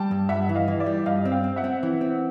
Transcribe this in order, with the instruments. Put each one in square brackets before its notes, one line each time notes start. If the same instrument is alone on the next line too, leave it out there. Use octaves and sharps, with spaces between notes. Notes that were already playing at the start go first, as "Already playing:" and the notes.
Already playing: [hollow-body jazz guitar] G3 [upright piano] G5 A5
[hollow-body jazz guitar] G2
[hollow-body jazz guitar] G2 [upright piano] E5 F#5
[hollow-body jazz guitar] E3
[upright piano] D#5 F5
[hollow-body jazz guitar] E3
[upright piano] D5 E5
[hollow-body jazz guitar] G3
[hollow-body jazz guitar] G2 [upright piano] D#5 F5
[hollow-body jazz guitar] C4
[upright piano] F5 G5
[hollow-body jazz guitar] C4
[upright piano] E5 F#5
[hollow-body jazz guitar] C4
E3
C4